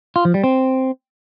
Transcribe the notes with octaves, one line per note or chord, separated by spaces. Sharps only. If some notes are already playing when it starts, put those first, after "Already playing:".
F4
F3
G3
C4